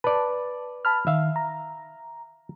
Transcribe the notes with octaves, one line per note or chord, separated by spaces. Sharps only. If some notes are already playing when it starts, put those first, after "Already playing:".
B4 D5 A5
A5 B5 F6
D#3 E5 F5
A#5